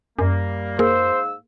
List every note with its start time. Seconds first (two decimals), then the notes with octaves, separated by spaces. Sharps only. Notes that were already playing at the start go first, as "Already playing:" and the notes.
0.19 F#2 G3 A#3
0.79 G#2 A#3 G#4 A#4 C5 F5 E6